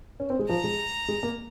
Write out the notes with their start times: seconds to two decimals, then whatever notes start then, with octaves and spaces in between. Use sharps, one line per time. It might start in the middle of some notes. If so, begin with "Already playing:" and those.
0.20 C#4
0.30 C4
0.39 G#3
0.49 F3 A#5
0.64 G#3
1.08 G#3
1.23 A#3